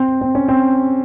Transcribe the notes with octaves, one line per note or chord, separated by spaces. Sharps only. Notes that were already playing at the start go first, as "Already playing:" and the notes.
Already playing: C4
C4
C#4
C4